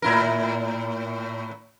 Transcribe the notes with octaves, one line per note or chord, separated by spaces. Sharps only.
A2 E4 A#4